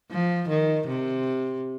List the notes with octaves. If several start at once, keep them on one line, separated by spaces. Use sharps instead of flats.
F3
D#3
C3